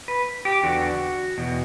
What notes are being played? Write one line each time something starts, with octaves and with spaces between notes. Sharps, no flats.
B4
G4
E2 D3 F#4
E2 B2